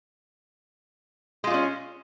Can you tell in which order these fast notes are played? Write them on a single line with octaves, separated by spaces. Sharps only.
G#3 F4 G3 C#4